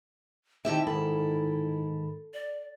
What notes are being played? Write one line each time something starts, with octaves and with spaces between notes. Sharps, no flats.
D#3 C4 E4 G4 E5 A5
G#2 D#3 A4 B5
D5